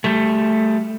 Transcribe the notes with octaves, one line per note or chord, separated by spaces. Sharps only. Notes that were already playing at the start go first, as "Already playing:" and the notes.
G3 A3